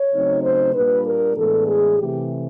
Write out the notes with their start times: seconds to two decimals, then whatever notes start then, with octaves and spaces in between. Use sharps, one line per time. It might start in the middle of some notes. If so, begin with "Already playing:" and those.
Already playing: C#5
0.13 C#3 F#3 A3 C4 D#4
0.43 C5
0.74 A#2 G3 A#3 D4 B4
1.05 A#4
1.36 A2 E3 G#3 B3 D4 A4
1.67 G#4
1.97 C3 E3 A3 G4